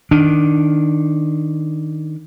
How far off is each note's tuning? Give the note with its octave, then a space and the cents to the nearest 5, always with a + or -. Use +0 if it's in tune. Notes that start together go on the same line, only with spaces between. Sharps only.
D#3 +0 D4 +0